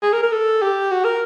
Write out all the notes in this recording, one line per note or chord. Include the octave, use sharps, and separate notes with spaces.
G#4
A#4
A#4
A4
G4
F#4
A#4